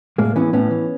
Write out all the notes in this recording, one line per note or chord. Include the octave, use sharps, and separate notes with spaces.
A2 G#3 A#3
E3 B3 C#4
A2 B3 C#4
E3